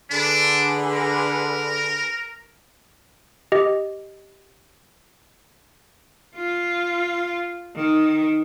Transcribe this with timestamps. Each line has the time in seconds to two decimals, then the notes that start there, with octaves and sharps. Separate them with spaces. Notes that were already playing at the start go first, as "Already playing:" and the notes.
0.10 D3 D4 G#4 B4
0.92 A#4
3.52 G4 D#5
6.37 F4
7.76 D#3